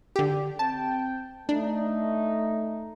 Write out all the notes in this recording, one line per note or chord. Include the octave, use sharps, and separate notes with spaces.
D3 G4
C4 G5 A5
A3 D4 D#4